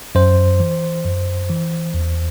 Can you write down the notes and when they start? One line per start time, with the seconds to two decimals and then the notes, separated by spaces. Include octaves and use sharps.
0.15 F#2 C5
0.60 E3
1.05 F#2
1.49 E3
1.94 E2